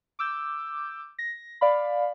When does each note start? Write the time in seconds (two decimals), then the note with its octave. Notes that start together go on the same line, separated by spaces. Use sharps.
0.19 D6 E6 G6
1.19 A#6
1.61 D5 F5 B5